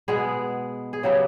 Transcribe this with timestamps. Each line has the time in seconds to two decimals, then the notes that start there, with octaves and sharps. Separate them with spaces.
0.08 B2 G#3 B3 G#4
0.93 G#4
1.03 C#3 F#3 B3 G4